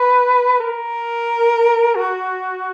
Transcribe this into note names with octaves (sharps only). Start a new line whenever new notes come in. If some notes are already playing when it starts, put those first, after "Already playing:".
Already playing: B4
A#4
F#4